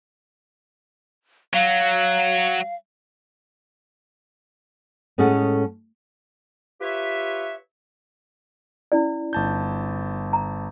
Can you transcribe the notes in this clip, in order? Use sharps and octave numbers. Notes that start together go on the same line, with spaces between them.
F#3 F5
A2 G#3 C#4 G#4 A4 F#5
F4 G4 B4 C#5 E5
C#4 E4 D5
G1 A5 G6
A#5